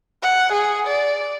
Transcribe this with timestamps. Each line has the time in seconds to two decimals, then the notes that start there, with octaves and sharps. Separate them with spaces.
0.22 F#5
0.52 G#4
0.88 D5